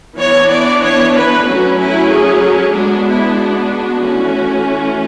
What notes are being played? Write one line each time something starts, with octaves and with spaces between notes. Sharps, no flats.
E3 B3 D4 C#5
D5
C#5
B4
F#3 A3 C#4 F#4
E4
G#4
G#3 B3 D4 F#4
E4
F#4
E3 A3 C#4